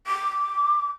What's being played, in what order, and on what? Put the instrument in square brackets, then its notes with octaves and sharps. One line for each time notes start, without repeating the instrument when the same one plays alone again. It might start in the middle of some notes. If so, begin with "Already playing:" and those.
[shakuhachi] D6